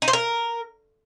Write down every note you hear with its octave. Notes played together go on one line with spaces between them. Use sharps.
D#4
C5
A#4